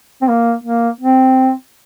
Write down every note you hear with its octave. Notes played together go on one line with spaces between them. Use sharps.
C4
A#3
A#3
C4